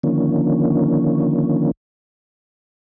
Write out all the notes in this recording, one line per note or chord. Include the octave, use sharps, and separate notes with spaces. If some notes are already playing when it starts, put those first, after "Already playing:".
D3 D#3 F3 A#3 C#4